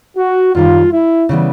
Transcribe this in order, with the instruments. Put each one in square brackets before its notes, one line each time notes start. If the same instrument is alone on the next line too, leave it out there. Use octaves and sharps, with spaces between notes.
[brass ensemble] F#4
[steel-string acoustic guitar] F#2 D#3 G3 [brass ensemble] F4
[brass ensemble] E4
[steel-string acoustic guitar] C#3 E3 G3 B3